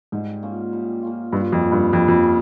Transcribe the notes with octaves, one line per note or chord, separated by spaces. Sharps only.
G#2 G3
A#3 C#4 F4
G3
A#3 C#4 F4
G2 A#2
F2
G3 C#4
G2
F2 A#2
F2
G3 C#4